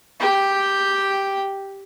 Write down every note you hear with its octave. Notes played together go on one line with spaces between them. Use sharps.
G4 G5